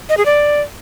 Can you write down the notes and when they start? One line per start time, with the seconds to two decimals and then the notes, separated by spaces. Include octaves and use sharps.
0.09 D#5
0.17 G#4
0.25 D5